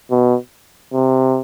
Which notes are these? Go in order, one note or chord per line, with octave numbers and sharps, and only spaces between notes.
B2
C3